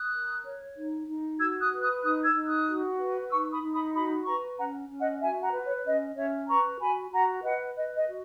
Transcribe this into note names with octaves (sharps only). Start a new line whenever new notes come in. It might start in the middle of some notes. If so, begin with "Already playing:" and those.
Already playing: D#6 F#6
A#4
C#5
D#4
D#4
F#4 E6 G#6
D#6 F#6
B4
D#6 F#6
D#4 D#6 F#6
E6 G#6
D#4
D#6 F#6
F#4
B4
D#4 C#6 E6
B5 D#6
D#4
B5 D#6
F#4 B5 D#6
B4 A#5 C#6
C#4 F#5 A#5
C#4
D#5 F#5
F#4 E5 G#5
F#5 A#5
B4
C#5
C#4 D#5
C#4 C#5 E5
B4 A#5 C#6
F#4 G#5 B5
F#4 F#5 A#5
B4 D#5 F#5
B4 D#5
D#5
F#4